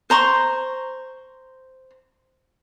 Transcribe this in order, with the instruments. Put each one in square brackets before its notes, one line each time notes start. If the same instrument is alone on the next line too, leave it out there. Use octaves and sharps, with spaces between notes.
[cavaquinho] C5 A#5 C6 C#6